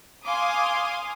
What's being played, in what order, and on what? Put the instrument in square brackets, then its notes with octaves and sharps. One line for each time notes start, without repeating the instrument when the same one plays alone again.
[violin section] F5 G#5 C6 D6 D#6